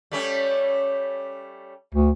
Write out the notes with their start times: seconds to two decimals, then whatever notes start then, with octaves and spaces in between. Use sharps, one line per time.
0.12 G3 A3 C#4
1.94 D2